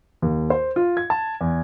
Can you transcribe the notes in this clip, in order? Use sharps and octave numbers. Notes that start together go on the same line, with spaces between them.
D#2
C5
F4
G#6
A5
E2